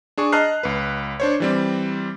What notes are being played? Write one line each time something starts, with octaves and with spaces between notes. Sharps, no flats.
D4 G#4 C#6
D#5 A5 A#5 F6 F#6 C7
C#2 B4
D4 C5 C#5
E3 G3 C4